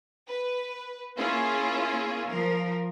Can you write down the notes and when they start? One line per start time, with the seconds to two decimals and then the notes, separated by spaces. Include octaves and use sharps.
0.29 B4
1.17 A#3 C#4 E4 F4 G#4
2.29 F3 A#4